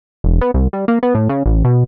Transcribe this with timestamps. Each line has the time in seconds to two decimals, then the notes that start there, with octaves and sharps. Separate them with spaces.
0.24 E1
0.41 B3
0.54 C2
0.73 G3
0.88 A#3
1.03 B3
1.15 A2
1.29 C#3
1.46 A1
1.65 B2